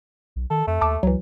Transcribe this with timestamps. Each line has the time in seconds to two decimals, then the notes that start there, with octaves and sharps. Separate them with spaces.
0.36 B1
0.50 D#3 A4
0.67 F2 A3
0.81 D#2 A5 D6 E6
1.03 C#2 E3 F#3